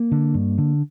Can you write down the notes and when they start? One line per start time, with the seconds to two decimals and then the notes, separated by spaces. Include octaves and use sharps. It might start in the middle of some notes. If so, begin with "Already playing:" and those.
Already playing: A#3
0.11 D3
0.34 G2
0.58 D3